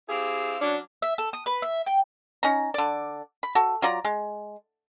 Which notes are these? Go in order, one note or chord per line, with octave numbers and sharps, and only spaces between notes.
C4 E4 G4 G#4 F5
F#3 C#4 D4
E5
A4
D#6
B4
E5
G5
C#4 D#4 A#5
D3 D5
B5
F#4 A4
F#3 F4 D5 A#5
G#3